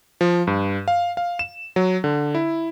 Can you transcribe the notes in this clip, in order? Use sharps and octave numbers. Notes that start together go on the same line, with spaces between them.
F3
G2
F5
F5
E7
F#3
D3
E4